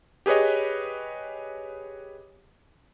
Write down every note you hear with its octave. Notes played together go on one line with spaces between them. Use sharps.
G4 G#4 B4 C#5 D#5